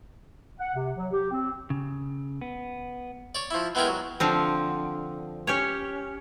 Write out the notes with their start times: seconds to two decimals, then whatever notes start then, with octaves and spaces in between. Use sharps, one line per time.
0.59 F#5
0.75 C3
0.97 F#3
1.12 G4
1.31 C4
1.70 C#3
2.41 B3
3.35 C#5 D5
3.51 F3 E4
3.75 G#3 B3 E4 G4 G#4 A#4
3.87 F#3
4.20 D3 F3 C4
5.47 C#4 G4 C#5